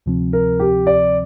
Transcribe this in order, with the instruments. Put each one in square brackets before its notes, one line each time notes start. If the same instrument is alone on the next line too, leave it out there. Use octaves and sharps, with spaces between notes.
[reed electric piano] D2 C3 F3 C4
[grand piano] A#4
G4
D5